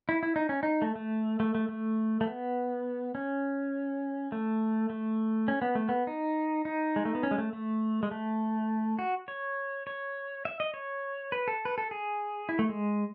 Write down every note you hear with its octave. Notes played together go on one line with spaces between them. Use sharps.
E4
E4
D#4
C#4
D#4
A3
A3
A3
A3
A3
A3
B3
C#4
A3
A3
C#4
B3
A3
B3
D#4
D#4
G#3
A3
B3
C#4
G#3
A3
A3
G#3
A3
F#4
C#5
C#5
E5
D#5
C#5
B4
A4
B4
A4
G#4
E4
A3
G#3